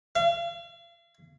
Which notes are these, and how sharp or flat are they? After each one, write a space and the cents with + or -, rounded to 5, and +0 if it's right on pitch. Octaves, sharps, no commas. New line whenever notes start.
F5 -40